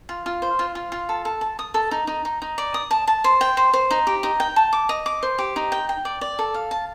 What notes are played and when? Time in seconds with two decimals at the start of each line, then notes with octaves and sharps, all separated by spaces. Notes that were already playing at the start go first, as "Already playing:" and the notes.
0.09 F4
0.26 F4
0.42 C5
0.59 F4
0.75 F4
0.92 F4
1.09 A4
1.25 A4
1.41 A5
1.59 D#6
1.74 A4
1.91 D#4
2.07 D#4
2.25 D#4
2.42 D#4
2.58 D5
2.74 D#6
2.91 A5
3.07 A5
3.24 C5
3.41 G5
3.57 C5
3.74 C5
3.91 D#4
4.07 G4
4.23 D#4
4.40 G5
4.56 A5
4.73 D6
4.89 D#5
5.06 D6
5.23 C5
5.39 G4
5.56 D#4
5.72 G5
5.89 G5
6.05 D5
6.21 D5
6.39 A4
6.54 F5
6.71 A5